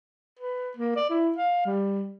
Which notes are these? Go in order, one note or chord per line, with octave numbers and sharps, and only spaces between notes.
B4
A#3
D5
E4
F5
G3